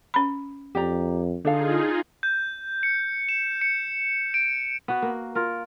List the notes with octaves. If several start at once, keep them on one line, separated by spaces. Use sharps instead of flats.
C#4 B5
F2 G4 D5 A#5
D3 D4 D#4 F4 G#4 A4 F5
G6
C#7
E7
C#7
D7
B3 F#4
A#3
F4 A#4